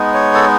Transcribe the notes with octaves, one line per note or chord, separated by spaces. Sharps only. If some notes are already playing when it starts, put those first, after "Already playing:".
Already playing: G#3 B3 D#4
C#5
A4